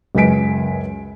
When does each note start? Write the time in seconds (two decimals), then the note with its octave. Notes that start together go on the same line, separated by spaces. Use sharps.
0.15 C#2 F#2 B4 G#5 B6 D7